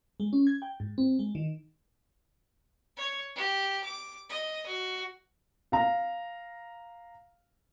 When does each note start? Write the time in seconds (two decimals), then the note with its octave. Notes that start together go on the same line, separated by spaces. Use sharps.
0.20 G#3
0.33 C#4
0.47 G#6
0.62 G5
0.80 G#2
0.98 C4
1.19 G#3
1.35 D#3
2.97 C#5
3.36 G4
3.84 D6
4.29 D#5
4.66 F#4
5.72 F5 A#5